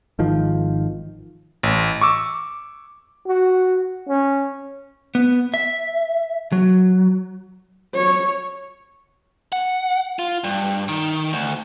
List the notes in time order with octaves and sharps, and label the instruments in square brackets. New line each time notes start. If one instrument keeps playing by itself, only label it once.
[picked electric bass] G#1 D#3 F3
[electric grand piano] A1
C#6 D6 E6
[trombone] F#4
C#4
[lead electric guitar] B3
E5
F#3
[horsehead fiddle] C#5
[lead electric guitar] F#5
F4
G2
D#3
D2